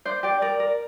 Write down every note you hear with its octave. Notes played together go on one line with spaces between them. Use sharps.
D4 C5
G4 D5
A#4 D5
A#4